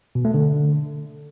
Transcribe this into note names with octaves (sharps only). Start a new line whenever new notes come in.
B2
A3
D3